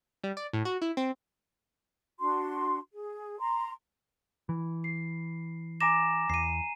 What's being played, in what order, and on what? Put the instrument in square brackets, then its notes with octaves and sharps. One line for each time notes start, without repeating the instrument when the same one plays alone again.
[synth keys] G3
D5
A2
F#4
E4
C4
[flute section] D4 F#4 C6
G#4
A#5 C6
[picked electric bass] E3
[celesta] C7
[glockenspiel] G#5 A#5 E7 [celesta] D6 A6 A#6
[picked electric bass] E2 [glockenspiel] C7 D#7